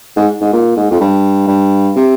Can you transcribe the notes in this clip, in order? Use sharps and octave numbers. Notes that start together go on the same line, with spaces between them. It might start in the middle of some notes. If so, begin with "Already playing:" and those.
G#2
G#2
A#2
G#2
F2
G2
G2
C3